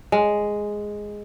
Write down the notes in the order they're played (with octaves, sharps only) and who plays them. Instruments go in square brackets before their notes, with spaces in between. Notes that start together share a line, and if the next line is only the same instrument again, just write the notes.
[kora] G#3